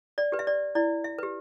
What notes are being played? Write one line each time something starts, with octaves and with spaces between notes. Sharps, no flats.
D5
G4 B4
E5
D5
E4 D5
E5
G4 B4